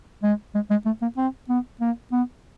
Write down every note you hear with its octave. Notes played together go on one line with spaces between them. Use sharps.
G#3
G#3
G#3
A3
A#3
C4
B3
A#3
B3